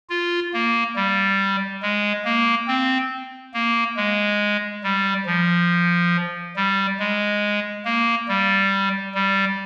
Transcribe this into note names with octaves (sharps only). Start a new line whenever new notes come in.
F4
A#3
G3
G#3
A#3
C4
A#3
G#3
G3
F3
G3
G#3
A#3
G3
G3